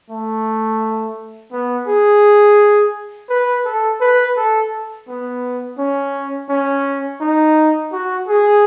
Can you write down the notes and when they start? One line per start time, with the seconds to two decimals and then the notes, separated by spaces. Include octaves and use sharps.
0.10 A3
1.52 B3
1.88 G#4
3.30 B4
3.65 A4
4.01 B4
4.37 A4
5.08 B3
5.79 C#4
6.50 C#4
7.21 D#4
7.92 F#4
8.28 G#4